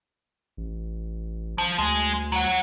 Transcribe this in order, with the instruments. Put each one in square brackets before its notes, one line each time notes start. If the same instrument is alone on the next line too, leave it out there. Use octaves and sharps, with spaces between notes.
[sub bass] A1
[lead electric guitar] F3
[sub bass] D2 [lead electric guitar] G#3
[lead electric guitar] F#3 F#5